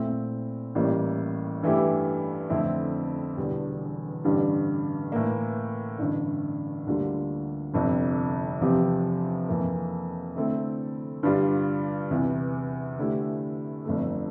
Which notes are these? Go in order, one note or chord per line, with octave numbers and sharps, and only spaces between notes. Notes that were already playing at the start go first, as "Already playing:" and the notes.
Already playing: A#2 A3 C4 E4
A1 A2 G3 A#3
G2 E3 A3 E4 G4
F2 D3 A3 C4 E4
E1 E2 D3 G3
A1 G2 D3 G3
A2 E3 A#3
A1 G2 D3
D2 D3 G3 A#3 F4
G1 F2 C3
E2 C3 F3 C4 G4
F2 E3 A#3
D3 A3 C4 E4 A4
G2 D3 G3 D4 F4
E2 C3 E3
D3 A3 E4 G4
G1 F2 D3 A3